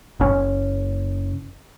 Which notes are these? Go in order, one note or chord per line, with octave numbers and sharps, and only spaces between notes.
F#1 C#4